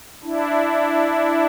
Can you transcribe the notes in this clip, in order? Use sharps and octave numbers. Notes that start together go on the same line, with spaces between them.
D4 E4